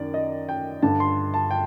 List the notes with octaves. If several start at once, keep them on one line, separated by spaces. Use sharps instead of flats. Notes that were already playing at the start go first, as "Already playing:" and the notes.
Already playing: F#2 D#3 D5
D#5
G5
G2 D3 A5
C6
A5
G5